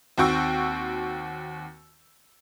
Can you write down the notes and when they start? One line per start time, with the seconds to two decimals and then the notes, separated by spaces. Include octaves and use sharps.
0.18 D#2 C4 F#4 G5 C#6 E6